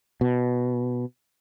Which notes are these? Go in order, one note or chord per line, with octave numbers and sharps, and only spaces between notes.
B2